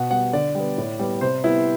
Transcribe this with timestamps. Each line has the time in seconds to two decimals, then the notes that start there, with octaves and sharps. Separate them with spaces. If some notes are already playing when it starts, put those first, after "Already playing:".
Already playing: B2 F#5
0.10 G3 B3 F#5
0.33 D3 D5
0.55 G3 B3
0.78 A2
0.99 G3 B3
1.21 C3 C5
1.44 G3 B3 E4